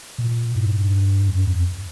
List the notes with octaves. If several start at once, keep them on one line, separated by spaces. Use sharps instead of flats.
A#2
G2
F#2
F2